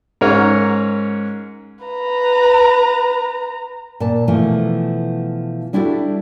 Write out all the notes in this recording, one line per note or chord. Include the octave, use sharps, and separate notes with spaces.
G#2 C#4 A#4 C#5 F#5
B4 A#5
A#2 A5
B2 E3 F3 A3
G3 D4 E4 F#4 G4 A4